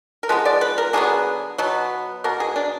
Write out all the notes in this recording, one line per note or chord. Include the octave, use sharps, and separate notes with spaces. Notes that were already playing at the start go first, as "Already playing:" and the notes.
A#4
F3 G#3 B3 B4
D5
B4
A#4
D3 F#3 B3 G#4
B2 F#3 B3
B2 A#3 A#4
G#4
D4